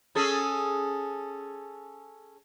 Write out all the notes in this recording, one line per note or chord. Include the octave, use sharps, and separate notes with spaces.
C#4 G#4 A4